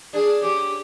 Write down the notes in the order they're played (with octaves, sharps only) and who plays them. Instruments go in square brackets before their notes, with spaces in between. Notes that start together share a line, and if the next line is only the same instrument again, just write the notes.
[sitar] D4 [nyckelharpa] G#4
[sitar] C#4 [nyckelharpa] G4